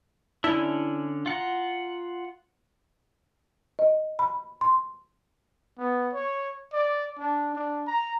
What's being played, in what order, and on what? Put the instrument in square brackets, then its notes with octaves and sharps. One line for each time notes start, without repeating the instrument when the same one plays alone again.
[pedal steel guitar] D3 C#4 D4 [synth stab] E4
[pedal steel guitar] F4 F#5 A#5
[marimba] D#5
B5
C6
[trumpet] B3
C#5
D5
D4
D4
A#5